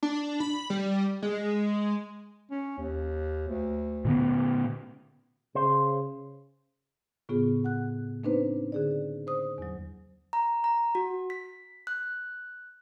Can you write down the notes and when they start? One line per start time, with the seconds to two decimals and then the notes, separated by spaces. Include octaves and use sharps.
0.03 D4
0.40 B5
0.70 G3
1.22 G#3
2.51 C#4
2.78 D#2
3.48 D2
4.05 A#2 D3 B3
5.55 C#3 C5
7.29 A2 C#3 B3 F4 G#4
7.64 F#5 F#6
8.24 A#3 C4 D4 D#4 B4 C5
8.72 D3 G#4 D5
9.27 C5 D#6
9.58 E2 F#3
10.33 A#5
10.64 A#5
10.95 F#4
11.30 B6
11.87 F#6